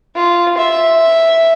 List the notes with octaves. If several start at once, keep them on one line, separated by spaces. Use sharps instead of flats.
F4
E5